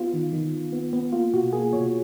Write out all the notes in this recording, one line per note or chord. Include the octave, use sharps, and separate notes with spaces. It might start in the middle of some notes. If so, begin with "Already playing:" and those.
Already playing: B3 F4
D#3
D#3
D#3
B3
B3
A#3 F4
B2 F#4
A#3 G#4
B2 C#5